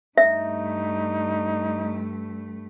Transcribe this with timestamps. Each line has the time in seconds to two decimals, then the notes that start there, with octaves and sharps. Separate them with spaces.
0.18 G2 A3 D#4 E5